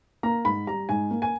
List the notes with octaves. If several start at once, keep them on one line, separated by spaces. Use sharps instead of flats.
A#3 A#5
G#2 B5
G3 A#5
G#2 G#5
A#3
G#5